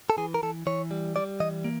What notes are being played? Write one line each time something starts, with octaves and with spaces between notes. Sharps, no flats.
A4
E3 G#4
A#4
E3 A4
E3 C#5
G3
G3 D5
E3 D#5
A#3